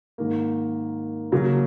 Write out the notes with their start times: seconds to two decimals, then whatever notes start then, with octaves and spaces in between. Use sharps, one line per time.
0.18 G#2 D#3 A#3
1.32 C#3 F#3 A#3